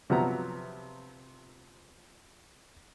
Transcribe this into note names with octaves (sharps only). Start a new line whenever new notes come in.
C3 F3 F#3 B3 A#5